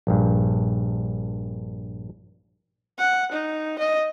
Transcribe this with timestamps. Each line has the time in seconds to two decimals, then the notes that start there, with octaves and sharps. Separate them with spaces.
0.07 A#1 G2
2.98 F#5
3.32 D#4
3.79 D#5